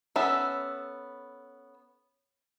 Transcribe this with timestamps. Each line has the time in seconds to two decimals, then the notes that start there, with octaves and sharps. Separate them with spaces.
0.16 B3 C#4 A4 E5